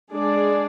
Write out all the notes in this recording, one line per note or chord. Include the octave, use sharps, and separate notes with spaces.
G#3 D4 G#4 D5